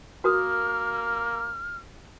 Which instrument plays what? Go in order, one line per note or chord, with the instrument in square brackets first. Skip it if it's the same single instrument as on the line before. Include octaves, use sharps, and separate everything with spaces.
[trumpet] A#3 [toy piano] F#4 A#4 D#6 [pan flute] F6